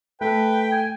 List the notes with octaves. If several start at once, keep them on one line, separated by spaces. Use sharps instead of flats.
A3 B4 G5
G#5